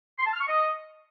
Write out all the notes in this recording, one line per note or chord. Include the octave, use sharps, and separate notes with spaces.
C6
A5
F6
C#6
D#5